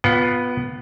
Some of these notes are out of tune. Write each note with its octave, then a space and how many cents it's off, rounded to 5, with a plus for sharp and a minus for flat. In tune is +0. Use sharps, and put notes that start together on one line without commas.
B3 +0 F4 +15 F#5 +40